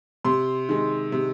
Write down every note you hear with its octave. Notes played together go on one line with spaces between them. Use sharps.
C3 C6
D#3 G#3
C3